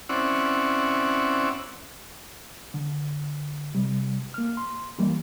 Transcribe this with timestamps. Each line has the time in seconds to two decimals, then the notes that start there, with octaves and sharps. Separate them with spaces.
0.09 C4 C#4 E4 D5 F#5
2.74 D3
3.74 C3 G3
4.34 A#3 F6
4.57 C6
4.98 E3 G3 A#3